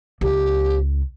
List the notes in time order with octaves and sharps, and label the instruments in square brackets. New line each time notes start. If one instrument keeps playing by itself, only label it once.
[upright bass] C#2 [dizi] G4